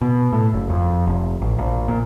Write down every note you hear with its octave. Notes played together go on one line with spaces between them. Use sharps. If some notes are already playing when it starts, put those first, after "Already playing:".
B2
A2
F#1
F2
F1
A1
A#1
A#2